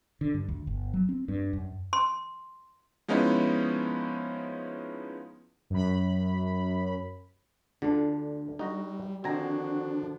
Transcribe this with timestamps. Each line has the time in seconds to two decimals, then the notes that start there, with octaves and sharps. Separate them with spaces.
0.21 D3
0.34 G2
0.49 D2
0.67 G1
0.94 F#3
1.09 C4
1.28 G2
1.53 F#2
1.93 C6
3.08 F3 G#3 B3 C#4 D#4 E4
5.70 F#2 B5
7.82 D2 D3 D4 F4 A4
8.59 G3 D#4 F#4 A#5
9.24 D3 D#3 F3 C4 D4 F#4 G#5 A#5